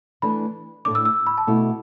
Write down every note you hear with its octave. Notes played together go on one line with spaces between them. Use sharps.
E3 A3 D4 B5
A2 A3 D4 D6
E6
E6
B5
A5
B2 A3 E4